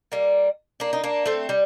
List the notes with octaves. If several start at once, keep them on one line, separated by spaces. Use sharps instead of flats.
G3 A#3
A#3 D4
D#4
A#3 D4
A3 C4
G3